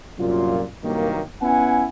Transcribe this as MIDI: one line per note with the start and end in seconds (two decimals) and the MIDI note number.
0.19 0.64 36
0.19 0.64 42
0.19 0.64 46
0.19 0.64 65
0.84 1.20 36
0.84 1.20 43
0.84 1.20 51
0.84 1.20 54
0.84 1.20 58
1.41 1.87 59
1.41 1.87 61
1.41 1.87 64
1.41 1.87 78
1.41 1.87 80